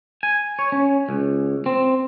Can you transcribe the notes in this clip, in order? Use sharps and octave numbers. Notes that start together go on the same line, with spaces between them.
G#5
C#5
C#4
C#2
C4